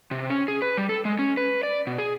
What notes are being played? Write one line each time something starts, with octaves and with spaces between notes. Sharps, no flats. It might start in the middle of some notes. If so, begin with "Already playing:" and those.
C3
C#4
G#4
B4
G3
A4
G#3
C#4
B4
D5
B2
G#4